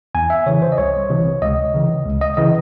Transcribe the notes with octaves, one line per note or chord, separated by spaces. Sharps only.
E2 G#5
E5
C#3 E3 C#5
C5
D#5
C2 C#5
C3 E3
C#2 D#5
C#3 E3
C#2
D#5
C#3 E3 D#5